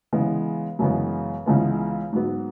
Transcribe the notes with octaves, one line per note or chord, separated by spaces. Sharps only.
C#3 E3 G#3 B3
F#2 C#3 E3 G#3 B3
C#2 C#3 E3 G#3 B3
G#2 F#3 B3